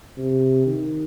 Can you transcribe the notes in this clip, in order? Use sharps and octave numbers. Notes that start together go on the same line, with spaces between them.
C3
D#3